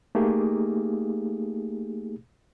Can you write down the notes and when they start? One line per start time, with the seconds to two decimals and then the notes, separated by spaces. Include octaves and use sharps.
0.15 A3 A#3 D#4 G4 G#4